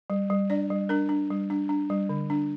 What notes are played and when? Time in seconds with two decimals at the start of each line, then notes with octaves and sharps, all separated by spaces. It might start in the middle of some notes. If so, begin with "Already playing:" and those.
0.10 G3
0.30 G3
0.50 D4 D5
0.70 G3
0.89 D4 A#4
1.09 D4
1.30 G3
1.50 D4
1.69 D4
1.90 G3
2.09 D3
2.30 D4